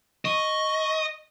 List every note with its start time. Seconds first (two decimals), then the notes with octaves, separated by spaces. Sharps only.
0.25 D#5 C#6